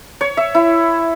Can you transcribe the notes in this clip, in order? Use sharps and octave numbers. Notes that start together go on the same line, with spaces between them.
C#5
E5
E4